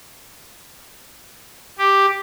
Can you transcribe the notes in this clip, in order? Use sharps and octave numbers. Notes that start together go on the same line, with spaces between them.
G4